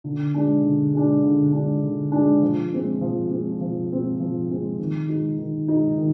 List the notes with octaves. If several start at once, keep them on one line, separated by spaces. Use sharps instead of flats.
D3
G#3 D4
D3
G#3 D4
D3
G#3 D4
D3
G#3 D4
F3
G#3 C4
F3
G#3 C4
F3
G#3 C4
F3
G#3 C4
D#3
G#3 D#4
D#3
G#3 D#4
D#3